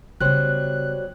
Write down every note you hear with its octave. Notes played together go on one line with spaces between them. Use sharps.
C#3 F#3 G3 B3 C5 F#6